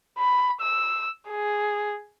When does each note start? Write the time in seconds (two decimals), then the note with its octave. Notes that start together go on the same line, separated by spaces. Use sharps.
0.18 B5
0.61 E6
1.29 G#4